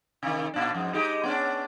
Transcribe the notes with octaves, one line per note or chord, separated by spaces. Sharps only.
C3 D#3
A#2 D4
F2 G#2
G#3 D#4 G4
B3 C#4 D4